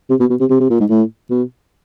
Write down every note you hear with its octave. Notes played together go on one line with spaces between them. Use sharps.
C3
B2
B2
C3
C3
C3
A#2
G#2
A2
B2